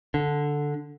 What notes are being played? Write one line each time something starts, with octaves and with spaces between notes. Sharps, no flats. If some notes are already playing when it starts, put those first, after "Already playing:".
D3